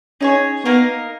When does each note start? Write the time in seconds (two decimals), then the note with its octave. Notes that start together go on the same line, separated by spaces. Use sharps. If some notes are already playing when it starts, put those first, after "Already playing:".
0.21 C#4 D#4 G#4 C#5
0.65 A#3 B3 D#4 A#4 F5